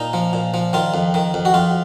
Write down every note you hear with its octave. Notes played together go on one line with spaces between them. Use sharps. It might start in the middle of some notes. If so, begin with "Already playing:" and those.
Already playing: A#2 D#4
F3
A#2
F3
D#3 F4
F2
D#3
F2
F#4
F2 F4